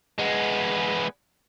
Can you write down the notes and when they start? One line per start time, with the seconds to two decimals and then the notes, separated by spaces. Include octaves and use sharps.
0.19 G#3 B3